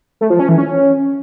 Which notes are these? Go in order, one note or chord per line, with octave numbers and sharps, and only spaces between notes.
A3
F3
C#4
E3
C#4